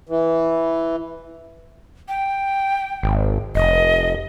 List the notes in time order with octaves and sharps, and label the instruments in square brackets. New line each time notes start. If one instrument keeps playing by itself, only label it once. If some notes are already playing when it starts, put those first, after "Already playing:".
[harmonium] E3
[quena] G5
[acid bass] G#1
[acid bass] F1 [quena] D#5